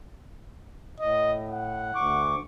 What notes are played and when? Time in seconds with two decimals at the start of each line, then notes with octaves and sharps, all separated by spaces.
1.00 A2 D#5
1.50 F#5
1.95 D2 C#6 D6